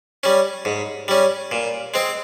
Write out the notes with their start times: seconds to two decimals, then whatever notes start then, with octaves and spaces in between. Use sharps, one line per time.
0.23 G3 C#4
0.65 G#2
1.08 G3 C#4
1.52 A#2
1.94 G#3 C4